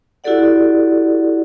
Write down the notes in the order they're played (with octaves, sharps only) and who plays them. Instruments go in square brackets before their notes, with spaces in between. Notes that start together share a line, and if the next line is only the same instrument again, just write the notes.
[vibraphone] E4 F#4 G4 A4 D5 F#5